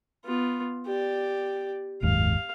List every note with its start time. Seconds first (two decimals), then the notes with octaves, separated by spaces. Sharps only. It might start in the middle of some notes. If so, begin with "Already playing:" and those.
0.25 B3 F4
0.86 G4 D5
2.02 F#1 D#2 G#2 F5